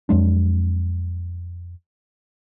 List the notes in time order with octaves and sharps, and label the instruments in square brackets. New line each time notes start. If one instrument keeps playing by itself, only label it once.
[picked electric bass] F2 F#3 G#3 D4